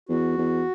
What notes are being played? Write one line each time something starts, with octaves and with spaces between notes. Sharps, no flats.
E2 F#4
E2